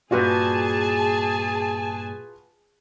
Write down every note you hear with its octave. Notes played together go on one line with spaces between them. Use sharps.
G2 A#2 F4 F#4 G#4 B4 G#5 A5